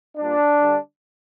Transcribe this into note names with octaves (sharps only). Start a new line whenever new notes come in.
A#2 G3 D4
D3 G3